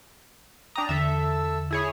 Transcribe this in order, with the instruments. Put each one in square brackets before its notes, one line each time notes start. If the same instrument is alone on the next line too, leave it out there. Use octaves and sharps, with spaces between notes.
[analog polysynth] D4 A#5 [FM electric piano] G5 D#6
[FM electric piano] E2 D3 [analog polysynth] A4 E5
[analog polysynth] E4 G#4 C#5